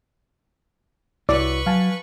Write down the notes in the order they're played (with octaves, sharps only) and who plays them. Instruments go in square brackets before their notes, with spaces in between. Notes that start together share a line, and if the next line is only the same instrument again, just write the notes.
[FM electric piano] C2 [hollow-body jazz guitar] E4 F#4 C#5 [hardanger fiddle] B4 C#6 [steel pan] D5
[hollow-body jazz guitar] F#3 [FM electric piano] F5 G#5 A5